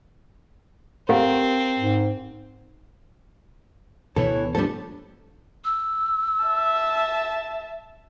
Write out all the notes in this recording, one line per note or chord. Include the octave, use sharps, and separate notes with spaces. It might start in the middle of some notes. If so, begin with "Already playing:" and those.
C4 G4 A#4 F5 F#5
G#2
D2 B2 E3 B3 A4 C#5
F3 G3 A3 D4 A4
E6
E5 A5